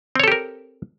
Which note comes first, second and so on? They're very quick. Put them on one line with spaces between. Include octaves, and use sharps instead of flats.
C4 C#5 A4 G4 A#4